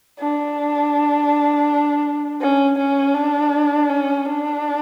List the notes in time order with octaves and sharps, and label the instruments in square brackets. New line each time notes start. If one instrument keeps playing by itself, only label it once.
[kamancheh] D4
C#4
C#4
D4
C#4
D4